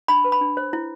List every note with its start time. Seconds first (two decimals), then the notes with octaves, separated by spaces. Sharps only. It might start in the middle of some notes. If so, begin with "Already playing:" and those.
0.08 D4 B5
0.25 B4
0.32 B5
0.41 D4
0.57 C5
0.73 E4